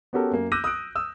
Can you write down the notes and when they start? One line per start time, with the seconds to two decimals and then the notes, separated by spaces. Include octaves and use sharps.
0.13 B3 C#4 F#4 G4 A4 A#4
0.31 F#2 A#3
0.52 D6 E6 F#6 G6 A#6 D#7
0.64 D#6 E6 F#6 D7
0.95 D#6 E6